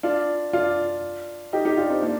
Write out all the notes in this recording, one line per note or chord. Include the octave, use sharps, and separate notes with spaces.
D4 F4
D4 F4
D#4 G4
D#4 G4
D4 F4
C4 D#4
A#3 D4